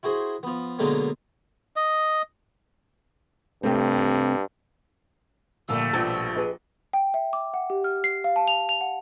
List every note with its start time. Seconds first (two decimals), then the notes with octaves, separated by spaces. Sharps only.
0.03 E4 F#4 G#4 C5
0.43 F3 B3
0.79 B2 D3 F#3 G#3 A#3 B3
1.76 D#5
3.63 G2 C3 A3 C4
5.69 A#2 D3 F3 G3 A3 E6
5.93 A#1 B2 F3
6.35 G#4 B4 D#5
6.93 G5
7.14 E5
7.33 D6
7.54 F#5
7.70 G4
7.84 F6
8.04 C7
8.24 F5
8.36 A5
8.48 F7
8.69 F7
8.81 F#5